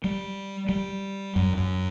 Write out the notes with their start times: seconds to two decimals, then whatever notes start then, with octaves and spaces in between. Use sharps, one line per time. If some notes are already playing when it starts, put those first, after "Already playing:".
0.04 G3
0.69 G3
1.36 F#2
1.57 F#2